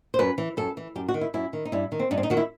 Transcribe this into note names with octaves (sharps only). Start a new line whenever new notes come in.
C5
F#2 B4
E3
F#2 A4
E3
F#2 G4
F#4
D#3
E4
F#2 E4
D#3
D#4
G2 E4
D#3
C4
G2 D#4
C4
D#4
D#3 F#4
E4